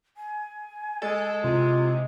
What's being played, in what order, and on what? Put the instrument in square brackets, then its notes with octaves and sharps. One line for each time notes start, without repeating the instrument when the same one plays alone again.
[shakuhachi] G#5
[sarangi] G#3 [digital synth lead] A4
[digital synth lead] C3 [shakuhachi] E4 [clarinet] F4